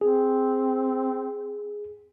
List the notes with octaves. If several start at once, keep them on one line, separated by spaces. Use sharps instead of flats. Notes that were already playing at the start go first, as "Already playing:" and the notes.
C4 G#4